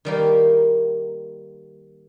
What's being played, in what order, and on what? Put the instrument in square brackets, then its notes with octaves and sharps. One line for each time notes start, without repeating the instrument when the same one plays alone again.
[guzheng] D#3 G3 A#3